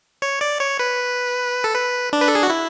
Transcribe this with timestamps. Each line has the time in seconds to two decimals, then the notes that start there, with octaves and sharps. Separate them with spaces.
0.22 C#5
0.41 D5
0.60 C#5
0.79 B4
1.64 A4
1.74 B4
2.13 D4
2.21 B4
2.28 A4
2.35 G#4
2.43 F#4
2.50 E4